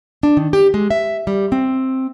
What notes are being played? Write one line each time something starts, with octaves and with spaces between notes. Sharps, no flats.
D4
D#3
G4
G#3
E5
G3
C4